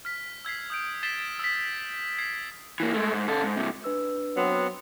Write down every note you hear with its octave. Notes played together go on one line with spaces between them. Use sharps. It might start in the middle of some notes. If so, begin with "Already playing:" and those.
F6 B6
E6 G#6 B6 C7
D#6 G6 D7
G#6 A6 B6 C7 E7 G7
E6 B6
G#6 C7
E3 A#3
G#3 A3
G#2
C#3 A4
G#2
G2 C3
D4 B4 E6
F#3 B3 C4 F#5